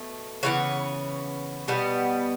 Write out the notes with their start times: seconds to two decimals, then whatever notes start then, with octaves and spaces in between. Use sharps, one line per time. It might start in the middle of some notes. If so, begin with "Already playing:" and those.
Already playing: B2 A3
0.43 C#3 E3 B3 C#5
1.68 B2 G3 B3